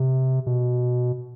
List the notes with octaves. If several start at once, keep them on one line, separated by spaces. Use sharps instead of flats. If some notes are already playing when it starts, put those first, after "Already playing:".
Already playing: C3
B2